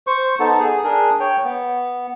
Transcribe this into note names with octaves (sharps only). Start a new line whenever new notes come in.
C5 C#6
B3 D#4 A4
G#4
D4 G#4 A#4
C#5 G5
B3